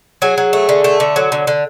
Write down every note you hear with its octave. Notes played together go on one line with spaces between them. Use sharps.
F#3 G#4
F#3
A3
D3
A3
D3
F#3
D3
D3